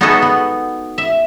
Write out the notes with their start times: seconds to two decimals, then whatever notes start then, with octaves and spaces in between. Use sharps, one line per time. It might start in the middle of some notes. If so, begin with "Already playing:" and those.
0.01 B3 D#4 F#4 G#4 A4 B4
0.22 B3
0.98 E5